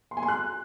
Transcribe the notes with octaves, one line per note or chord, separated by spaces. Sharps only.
C6
G#5
C6
F#6